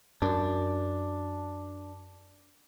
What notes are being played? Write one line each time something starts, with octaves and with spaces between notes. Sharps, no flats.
F#2 D4